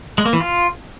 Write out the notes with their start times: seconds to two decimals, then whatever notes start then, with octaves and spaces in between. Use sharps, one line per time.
0.18 G#3
0.26 A#3
0.33 E3
0.41 F4